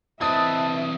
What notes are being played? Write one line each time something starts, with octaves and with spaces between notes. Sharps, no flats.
E3 C4 B4 D#5 E5 A5 D#6